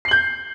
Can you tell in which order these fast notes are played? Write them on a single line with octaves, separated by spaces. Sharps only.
C7 F#7 G6